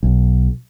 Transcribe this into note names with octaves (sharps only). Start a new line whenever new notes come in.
B1